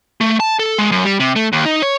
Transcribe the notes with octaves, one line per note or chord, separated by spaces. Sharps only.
A3
A5
A4
G#3
F#2
G3
C3
A3
D#2
D#4
C#5